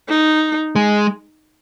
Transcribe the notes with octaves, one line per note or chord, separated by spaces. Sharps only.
D#4
G#3